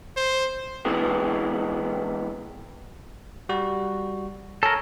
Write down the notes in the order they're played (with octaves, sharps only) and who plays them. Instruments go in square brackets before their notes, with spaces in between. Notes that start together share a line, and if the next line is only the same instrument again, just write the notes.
[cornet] C5
[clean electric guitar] C3 E3 G#3 B3
[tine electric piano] G3 F#4
[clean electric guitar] A4 A#4 [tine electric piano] C#5 G#5